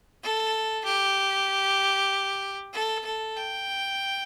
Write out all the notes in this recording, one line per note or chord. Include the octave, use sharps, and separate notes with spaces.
A4
G4
A4
A4
G5